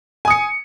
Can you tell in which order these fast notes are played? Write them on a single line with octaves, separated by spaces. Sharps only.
G#5 D#6 C#7